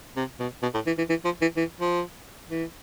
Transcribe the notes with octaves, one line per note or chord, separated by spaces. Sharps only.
C3
B2
B2
A2
E3
E3
E3
F3
E3
E3
F3
E3